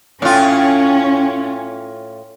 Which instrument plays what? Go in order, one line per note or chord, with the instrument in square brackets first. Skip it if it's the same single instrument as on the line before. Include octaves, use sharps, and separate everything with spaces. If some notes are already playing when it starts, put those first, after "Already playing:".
[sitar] A2 F4 [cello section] C#4